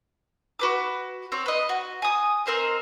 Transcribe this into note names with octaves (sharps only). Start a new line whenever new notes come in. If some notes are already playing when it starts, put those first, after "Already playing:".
F#4 B4 D6
C4 C#5
B4 D#5
F#4
G#5 D#6
C4 A#4 C5 D#5